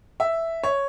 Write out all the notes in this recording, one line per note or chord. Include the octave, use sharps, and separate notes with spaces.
E5
C#5